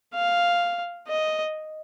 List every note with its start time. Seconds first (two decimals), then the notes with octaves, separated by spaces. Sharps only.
0.14 F5
1.08 D#5